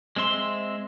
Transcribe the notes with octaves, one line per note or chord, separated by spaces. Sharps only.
G#3 C4 E5 C6